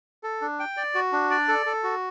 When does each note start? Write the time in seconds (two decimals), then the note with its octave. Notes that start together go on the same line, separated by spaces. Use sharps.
0.23 A4
0.41 D4
0.60 G5
0.77 D5
0.95 F#4
1.12 D4
1.30 D5
1.48 A4
1.66 A4
1.84 F#4